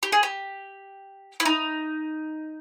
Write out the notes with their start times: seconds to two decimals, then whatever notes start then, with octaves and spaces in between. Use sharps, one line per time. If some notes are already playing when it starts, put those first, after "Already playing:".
0.03 G4
0.12 G#4
0.23 G4
1.40 E4
1.45 D#4